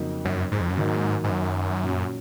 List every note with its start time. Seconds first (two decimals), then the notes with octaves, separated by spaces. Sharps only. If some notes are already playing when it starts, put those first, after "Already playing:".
Already playing: F2 C#3 F#3 A#3 D#4
0.25 F#2
0.52 G#2
0.61 F2
0.69 F#2
0.78 G#2 D#3 F#3 A#3 D#4
1.24 G#2
1.30 F#2
1.83 A#2 F#3 C#4